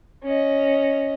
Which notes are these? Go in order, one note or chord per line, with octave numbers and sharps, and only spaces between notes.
C#4 D#5